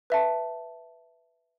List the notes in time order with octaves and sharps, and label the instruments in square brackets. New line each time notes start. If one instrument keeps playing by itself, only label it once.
[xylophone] B4 E5 A5